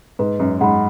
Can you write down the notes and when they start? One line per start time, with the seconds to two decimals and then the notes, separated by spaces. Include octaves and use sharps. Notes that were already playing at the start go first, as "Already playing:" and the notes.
0.19 G#2 B4
0.40 F#2
0.61 G#2 F#5 B5